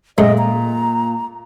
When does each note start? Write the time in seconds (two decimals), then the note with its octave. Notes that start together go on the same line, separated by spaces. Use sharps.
0.18 F#2 A#2 G#3 A3 D#5
0.38 A#5